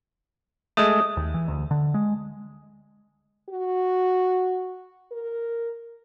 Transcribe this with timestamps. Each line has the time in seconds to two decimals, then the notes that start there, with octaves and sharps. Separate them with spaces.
0.77 G#3 A3 D#6
1.17 D#2
1.34 E3
1.48 D2
1.71 D3
1.94 G#3
3.50 F#4
5.12 A#4